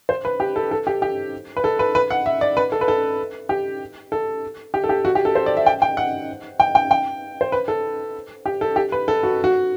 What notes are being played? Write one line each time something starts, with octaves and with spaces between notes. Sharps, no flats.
C5
B4
G4
A4
A4
G4
G4
B4
A4
B4
B4
F#5
E5
D5
B4
A4
B4
A4
G4
A4
G4
A4
G4
F#4
G4
A4
C5
D5
E5
G5
G5
F#5
G5
G5
G5
C5
B4
A4
G4
A4
G4
B4
A4
F#4
F#4